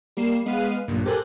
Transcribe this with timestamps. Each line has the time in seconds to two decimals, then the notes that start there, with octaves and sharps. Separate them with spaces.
0.17 G3 A#3 C7 E7
0.46 G#3 B3 B4 F5 D#7
0.88 B1 G2 A#2
1.05 G4 A4 A#4 C5 G#5 F#6